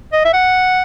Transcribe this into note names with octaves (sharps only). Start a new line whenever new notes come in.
D#5
E5
F#5